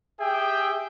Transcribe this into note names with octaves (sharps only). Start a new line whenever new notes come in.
G4 G#4 E5 G5